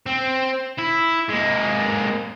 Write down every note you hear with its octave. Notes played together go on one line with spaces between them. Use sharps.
C4
E4
G#3 A#3